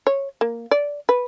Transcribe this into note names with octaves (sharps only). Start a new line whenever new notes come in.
C#5
A#3
D5
B4